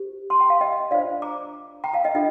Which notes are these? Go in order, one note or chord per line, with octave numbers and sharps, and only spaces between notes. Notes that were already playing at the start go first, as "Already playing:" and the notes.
Already playing: G4 C5
A5 C6
G5 A#5
F5 A5
D#5 G5
D4 F4 C5 D5 F5
A#5 D6
G5 A#5
F5 A5
D#5 G5
D4 F4 A4 D#5 G5